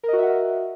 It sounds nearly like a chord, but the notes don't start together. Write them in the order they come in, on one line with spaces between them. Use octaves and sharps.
A#4 D#5 F#4 E5 F#5